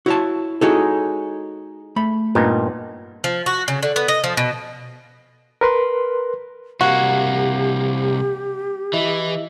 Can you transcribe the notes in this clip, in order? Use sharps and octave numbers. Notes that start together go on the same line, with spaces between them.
E4 F#4 C#5 A5
G#3 D#4 E4 F#4 A4 C#5
A3 B5
G2 A#2 B3 D#4
F3
F#4
C#3
D3
B3
D#5
F3
B2
A#4 B4 C6
C2 A#3 F#4 G4 F5 G#6
E3 E4 D#5 E5